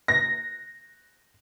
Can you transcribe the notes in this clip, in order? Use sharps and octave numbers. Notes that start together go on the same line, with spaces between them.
A#6